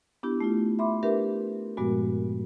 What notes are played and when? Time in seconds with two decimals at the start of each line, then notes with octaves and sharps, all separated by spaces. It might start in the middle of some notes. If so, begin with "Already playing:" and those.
0.23 B3 D4 E4 G4
0.41 A3 E4 F4
0.79 E5 B5 C6 D6
1.03 D4 G4 A#4 B4 E5
1.77 G2 A#2 F3 G#3 B3 F#4